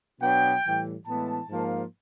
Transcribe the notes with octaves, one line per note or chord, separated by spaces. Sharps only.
B2 F#3 B3 D4 G5
A2 E3 G3
A2 E3 G#3 B3 A5
G#2 F3 A#3